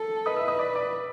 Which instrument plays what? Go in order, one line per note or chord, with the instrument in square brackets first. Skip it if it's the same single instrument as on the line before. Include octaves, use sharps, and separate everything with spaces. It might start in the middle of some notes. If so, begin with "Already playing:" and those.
Already playing: [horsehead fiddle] A4
[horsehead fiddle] B4 [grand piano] D#5 D#6
[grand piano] E5 E6
D#5 D#6
D5 D6
D5 D6